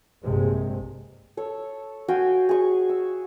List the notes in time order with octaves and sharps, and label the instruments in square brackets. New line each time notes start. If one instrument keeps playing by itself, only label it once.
[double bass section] A#1 G2 C3 G#3
[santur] A4 C#5
F#4 F5 G5 G#5
G#4 C#6
E6